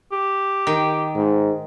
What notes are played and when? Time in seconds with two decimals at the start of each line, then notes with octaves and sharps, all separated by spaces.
0.12 G4
0.67 D#3
1.16 G#2